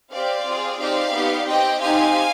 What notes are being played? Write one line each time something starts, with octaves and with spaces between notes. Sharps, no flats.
C4 G4 D5 F5
C4 F4 G#4
C4 D#4 G4 D5 F5
B3 D#4 G4
C4 G4 D#5 G5
C4 D#4 G4 F5 G#5